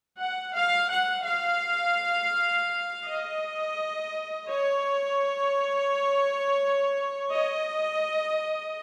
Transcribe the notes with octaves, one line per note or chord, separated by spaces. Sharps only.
F#5
F5
F#5
F5
D#5
C#5
D#5